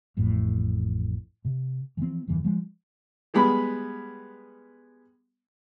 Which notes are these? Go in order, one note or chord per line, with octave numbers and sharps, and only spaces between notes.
A1 F2 A2
C3
E3 F3 C4
E1 G2 D#3 E3
F3 G#3
G3 G#3 B3 B5